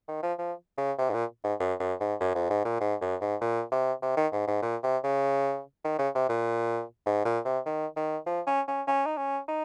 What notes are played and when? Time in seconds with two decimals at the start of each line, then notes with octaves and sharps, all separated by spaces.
0.08 D#3
0.23 F3
0.39 F3
0.78 C#3
0.99 C3
1.10 G#2
1.14 A#2
1.44 G#2
1.60 F#2
1.80 F#2
2.00 G#2
2.21 F#2
2.35 F2
2.50 G#2
2.65 A#2
2.81 G#2
3.02 F#2
3.21 G#2
3.41 A#2
3.72 C3
4.02 C3
4.17 D#3
4.32 G#2
4.48 G#2
4.62 A#2
4.83 C3
5.04 C#3
5.85 D#3
5.99 C#3
6.15 C3
6.29 A#2
7.06 G#2
7.25 A#2
7.45 C3
7.66 D#3
7.96 D#3
8.27 F3
8.47 C#4
8.68 C#4
8.88 C#4
9.06 D#4
9.18 C#4
9.48 D#4